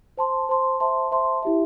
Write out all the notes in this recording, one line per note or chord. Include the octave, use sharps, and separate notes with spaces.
C5 A5 C6
C5 A5 C6
C5 E5 A5 C6
C5 E5 A5 C6
E4 G4 E5